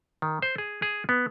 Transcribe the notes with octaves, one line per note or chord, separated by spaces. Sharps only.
D#3
C5
G#4
G#4
B3